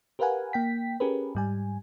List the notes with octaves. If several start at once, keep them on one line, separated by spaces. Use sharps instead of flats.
G4 A#4 B4 F5 F#5 G#5
A#3 G5 B6
C#4 G4 G#4 A#4 B4
G#2 G3 G#5